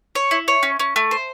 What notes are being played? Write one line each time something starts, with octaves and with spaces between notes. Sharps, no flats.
C#5
E4
C#5
C#4
C#4
A3
C5